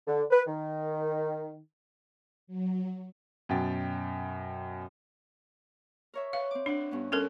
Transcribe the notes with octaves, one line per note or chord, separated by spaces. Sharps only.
D3
B4
D#3
F#3
F#2 B2 G5 A6
A#4 C#5 E5
B4 F5
C4 D6
D4 D5 F#5
G2 B3 C#4
G3 C#4 A4 A#4